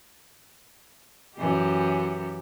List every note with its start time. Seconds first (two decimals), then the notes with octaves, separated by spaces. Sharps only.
1.36 F#2 E3 G4